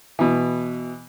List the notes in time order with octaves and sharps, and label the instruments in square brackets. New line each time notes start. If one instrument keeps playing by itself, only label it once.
[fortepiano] B2 E3